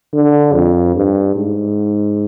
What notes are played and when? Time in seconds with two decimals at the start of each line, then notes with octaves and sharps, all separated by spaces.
0.13 D3
0.54 F2
0.95 G2
1.35 G#2